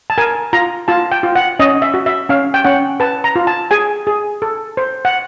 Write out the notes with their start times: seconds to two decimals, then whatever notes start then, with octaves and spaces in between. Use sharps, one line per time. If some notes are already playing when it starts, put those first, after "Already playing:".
0.10 A5
0.18 A#4 G#5
0.53 F4 A#5
0.88 F4 A5
1.12 G5
1.23 F4
1.35 F#5
1.59 C#4 D#5
1.82 E5
1.94 F#4
2.06 E5
2.29 C#4 F5
2.54 G5
2.64 C#4 F#5
3.00 B4 A5
3.24 A#5
3.36 F4
3.47 A5
3.71 G#4 G#5
4.07 G#4
4.42 A4
4.77 C5
5.05 F#5